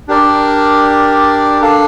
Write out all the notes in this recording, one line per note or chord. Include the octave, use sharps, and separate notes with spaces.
D4 G4 A#4 D5
D4 A4 D5 F5